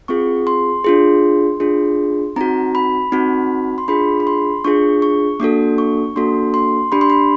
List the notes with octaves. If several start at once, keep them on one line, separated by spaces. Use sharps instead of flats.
C4 F4 G#4 C#6
C6
D4 F4 G#4
D4 F4 G#4
C4 D#4 F#4 A#5
B5
C4 D#4 F#4
C6
D4 F4 G#4 B5
B5
C6
D4 F4 G#4 C#6
C#6
A#3 D4 F#4 A4 D6
C#6
A#3 D4 F#4 A4 C6
C6
D4 G4 B5
C6
B5